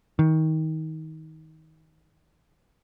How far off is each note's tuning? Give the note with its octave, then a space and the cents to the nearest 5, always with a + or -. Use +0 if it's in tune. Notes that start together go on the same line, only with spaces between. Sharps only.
D#3 +25